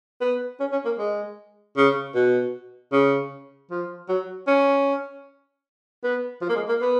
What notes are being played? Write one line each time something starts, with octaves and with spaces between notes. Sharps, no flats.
B3
C#4
C#4
A#3
G#3
C#3
B2
C#3
F3
F#3
C#4
B3
F3
A#3
G#3
A#3
B3